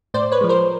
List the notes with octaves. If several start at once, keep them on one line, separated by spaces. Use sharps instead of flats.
A2 C5 D5
B4 C#5
F3 G#3
A#4 C5